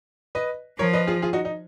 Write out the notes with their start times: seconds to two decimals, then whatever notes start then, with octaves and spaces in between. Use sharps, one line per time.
0.35 B4 D#5
0.79 F3 A#4 C#5
0.93 B4 D#5
1.07 F4 G#4
1.22 F4 G#4
1.33 D#4 F#4
1.45 D#4